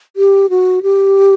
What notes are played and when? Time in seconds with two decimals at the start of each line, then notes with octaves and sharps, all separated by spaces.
0.16 G4
0.50 F#4
0.83 G4